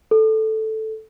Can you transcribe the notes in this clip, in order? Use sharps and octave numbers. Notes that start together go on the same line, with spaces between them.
A4